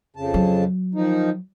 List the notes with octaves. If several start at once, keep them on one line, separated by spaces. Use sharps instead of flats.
F2 C#3 A5
F#3
D#3 F3 D#4